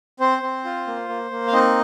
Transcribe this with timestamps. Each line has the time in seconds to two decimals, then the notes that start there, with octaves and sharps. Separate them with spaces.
0.20 C4 C5
0.42 C4
0.65 F4
0.87 A#3
1.09 A#3
1.31 A#3
1.47 F5
1.52 C4 D#4 D#5